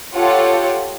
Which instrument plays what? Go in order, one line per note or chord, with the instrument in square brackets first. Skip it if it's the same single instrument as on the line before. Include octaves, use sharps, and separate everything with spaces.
[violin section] F4 G4 A4 C#5 F#5